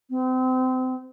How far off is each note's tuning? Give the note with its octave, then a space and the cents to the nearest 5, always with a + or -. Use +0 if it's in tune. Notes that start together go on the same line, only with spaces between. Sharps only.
C4 -30